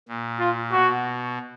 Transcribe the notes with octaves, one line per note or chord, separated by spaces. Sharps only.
A#2
F4
B2 F#4